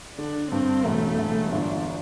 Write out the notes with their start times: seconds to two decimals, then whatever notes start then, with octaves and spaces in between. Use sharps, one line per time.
0.18 D3 D4
0.51 G2 C4
0.85 E1 A3
1.19 E1
1.52 G1 D4